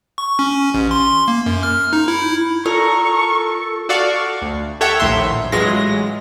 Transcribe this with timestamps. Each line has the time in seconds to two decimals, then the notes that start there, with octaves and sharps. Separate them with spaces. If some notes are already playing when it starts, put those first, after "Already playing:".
0.18 C#6
0.39 C#4
0.74 A1
0.91 C6
1.28 A#3
1.46 F#2
1.63 F6
1.93 D#4
2.08 E4
2.66 F4 A4 A#4 C#6
3.89 F#4 A4 D5 F5 F#5 C#6
4.42 D2
4.81 G4 A4 C#5 E5 F#5 G5
5.00 A#1 D#2 A2 E5 C6
5.52 A1 E3 F#3 G#3 F4 A#6